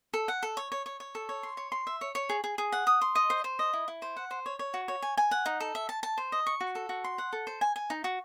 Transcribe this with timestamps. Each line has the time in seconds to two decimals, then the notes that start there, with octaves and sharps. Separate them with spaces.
0.14 A4
0.28 F#5
0.43 A4
0.57 C#5
0.72 C#5
0.86 C#5
1.00 C#5
1.15 A4
1.29 C#5
1.43 C6
1.57 C#5
1.72 C6
1.87 E5
2.01 C#5
2.15 C#5
2.29 G#4
2.44 G#4
2.58 G#4
2.72 F#5
2.87 D#6
3.01 C6
3.15 D#5
3.30 C5
3.44 C5
3.59 D#5
3.73 E4
3.88 E4
4.02 C5
4.16 F#5
4.31 C5
4.46 C#5
4.59 C#5
4.74 F#4
4.88 C#5
5.02 G#5
5.17 G#5
5.31 F#5
5.46 D#4
5.60 A4
5.75 E5
5.89 A5
6.03 A5
6.18 C5
6.32 D#5
6.46 C#6
6.61 F#4
6.75 A4
6.89 F#4
7.04 C6
7.18 F#5
7.33 A4
7.47 C5
7.61 G#5
7.76 G#5
7.90 D#4
8.04 F#4